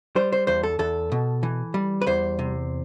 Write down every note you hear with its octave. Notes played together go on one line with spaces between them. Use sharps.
G3 C5
C5
E2 C5
A4
E2 A4
B2
E3
G3
B4
E2 C5
C3